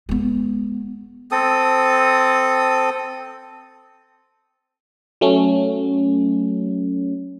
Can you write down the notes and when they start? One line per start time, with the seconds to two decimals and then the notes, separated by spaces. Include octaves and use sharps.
0.09 G#3 B3
1.31 C4 A4 D#6
5.21 F#3 A3 C#4